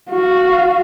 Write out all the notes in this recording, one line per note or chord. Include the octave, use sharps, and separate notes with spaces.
F#4 F5